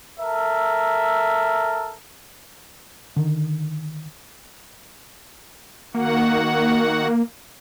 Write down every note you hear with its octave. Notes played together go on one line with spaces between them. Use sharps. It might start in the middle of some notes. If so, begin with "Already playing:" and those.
A4 A#4 E5
D3 D#3
D#3 A#3 F#4 F#5